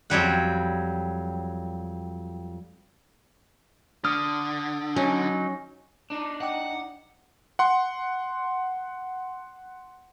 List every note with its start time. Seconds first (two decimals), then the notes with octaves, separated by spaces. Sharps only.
0.10 F2 F#3 G3 F#5
4.05 D3 D#6 F6
4.96 F#3 C#4 D#4
6.10 D4 D#4
6.41 D#5 F#5 G5 D6
7.59 F#5 C6